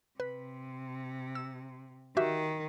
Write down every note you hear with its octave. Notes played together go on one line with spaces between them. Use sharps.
C3 B4
E6
D#3 F#4 G4 E5